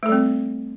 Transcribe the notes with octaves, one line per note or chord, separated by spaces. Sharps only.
G3 A3 C4 A4